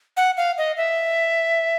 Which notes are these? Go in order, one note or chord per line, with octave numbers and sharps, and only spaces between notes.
F#5
F5
D#5
E5